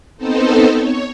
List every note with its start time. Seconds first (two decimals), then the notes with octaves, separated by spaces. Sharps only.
0.17 B3 C4 D#4 A4 C5
0.72 C#5